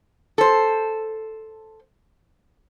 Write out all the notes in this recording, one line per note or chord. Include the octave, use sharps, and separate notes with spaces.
A4 C5